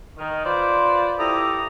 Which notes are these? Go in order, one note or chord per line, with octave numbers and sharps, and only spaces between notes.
D#3
F4 B4 C5 D5
E4 G4 A4 A#5 D#6